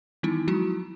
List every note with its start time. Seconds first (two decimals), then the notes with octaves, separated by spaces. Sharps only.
0.23 D#3 E3 G3 B3 D#4 E4
0.47 F3 F#3 G#3 E4 F#4